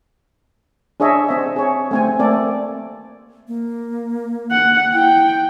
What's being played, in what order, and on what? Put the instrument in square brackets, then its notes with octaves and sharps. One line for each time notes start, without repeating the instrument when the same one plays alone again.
[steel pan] D4 G#4 C#5 D#5 E5
C4 E5
G#4 C#5
A3 C4 G#5
A3 A#3 C4 A4 D5
[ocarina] A#3
[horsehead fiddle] F#5
[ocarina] E4 [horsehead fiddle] G5